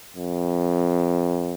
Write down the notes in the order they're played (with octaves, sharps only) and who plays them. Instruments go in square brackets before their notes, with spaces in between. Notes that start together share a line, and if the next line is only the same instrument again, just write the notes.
[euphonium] F2